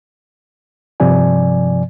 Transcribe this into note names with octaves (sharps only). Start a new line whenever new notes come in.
G2 C3 F3 D5 G#5